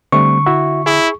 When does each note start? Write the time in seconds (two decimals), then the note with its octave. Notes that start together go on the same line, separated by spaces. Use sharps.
0.12 D3 G3 A3 C4 C#6
0.46 E4 F#4 E5
0.86 E4 G#4